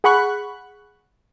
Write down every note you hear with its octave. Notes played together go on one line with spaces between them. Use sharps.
G#4 F#5 B5 C#6 F#6